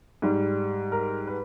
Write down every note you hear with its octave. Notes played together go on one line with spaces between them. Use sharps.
G#2 G3
A#4
B4